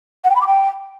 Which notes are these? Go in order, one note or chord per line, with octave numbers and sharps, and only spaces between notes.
F#5
G5
B5
D6
G5